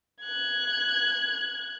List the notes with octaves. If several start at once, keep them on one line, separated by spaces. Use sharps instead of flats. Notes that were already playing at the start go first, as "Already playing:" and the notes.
F#6 G#6